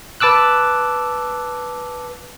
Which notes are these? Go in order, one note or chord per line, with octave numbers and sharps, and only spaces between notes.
B4 A5 D6 E6 F#6